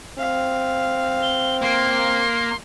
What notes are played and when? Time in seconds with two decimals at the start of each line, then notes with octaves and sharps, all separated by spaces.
0.18 C4 F5
1.22 G7
1.62 A#3 C6